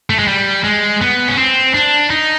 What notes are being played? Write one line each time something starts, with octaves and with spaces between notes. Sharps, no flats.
A3
G#3
G3
G#3
B3
C#4
C4
D4
D#4